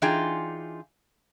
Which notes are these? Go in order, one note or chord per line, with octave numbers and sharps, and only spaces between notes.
E3 D4 D#4 F4 G#4 G5